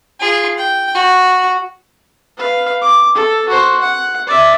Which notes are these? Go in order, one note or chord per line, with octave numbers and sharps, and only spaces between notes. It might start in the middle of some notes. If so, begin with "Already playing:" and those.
F4 G#4
G5
F#4
B4 F5
D6
A4
F#4 C5
F#5
D5 E5